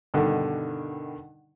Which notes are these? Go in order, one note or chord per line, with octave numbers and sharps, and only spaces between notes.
G2 B2 D3 D#3